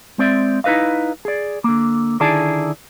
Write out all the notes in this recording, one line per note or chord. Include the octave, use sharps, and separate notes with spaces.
G#3 C4 D5 E5
D#4 E4 B4 D#5 F5
G#4 D5
D3 A#3
D3 D#3 E4 G#4 D5 A5